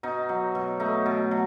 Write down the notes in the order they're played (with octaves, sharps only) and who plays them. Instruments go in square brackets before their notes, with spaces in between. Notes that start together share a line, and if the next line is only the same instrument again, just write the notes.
[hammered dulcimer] B2 D#4
F#3
B2
A3 D#4
B2
F#3